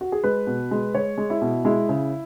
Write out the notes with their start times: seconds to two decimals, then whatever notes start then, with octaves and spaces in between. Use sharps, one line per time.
0.01 F#4
0.12 G#4
0.24 G#3 B4
0.47 B2
0.71 G#3
0.94 G#3 C#5
1.18 G#3
1.30 E4
1.42 B2
1.65 G#3 E4
1.89 C#3